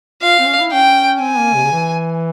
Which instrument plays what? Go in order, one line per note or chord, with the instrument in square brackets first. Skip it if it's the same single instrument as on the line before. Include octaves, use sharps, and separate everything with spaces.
[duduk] F4 [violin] F5
[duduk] C4
C#4
E4
[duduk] C#4 [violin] G5
[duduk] C4 [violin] G#5
[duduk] A#3
C3
C#3
E3